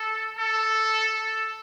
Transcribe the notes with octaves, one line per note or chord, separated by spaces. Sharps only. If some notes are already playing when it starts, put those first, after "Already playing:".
Already playing: A4
A4
A4